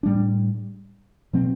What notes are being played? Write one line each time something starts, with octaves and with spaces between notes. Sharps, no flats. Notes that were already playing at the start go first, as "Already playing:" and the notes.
A2 G3 D4
B2 F#3 C4